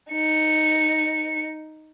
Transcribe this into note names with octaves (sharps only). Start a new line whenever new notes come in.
D#4 C#7